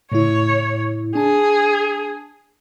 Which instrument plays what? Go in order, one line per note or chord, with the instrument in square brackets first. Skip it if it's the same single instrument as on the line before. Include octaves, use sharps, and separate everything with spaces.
[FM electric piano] A2 C#3 E4 [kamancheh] C#5
[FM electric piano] D4 A5 [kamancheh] G#4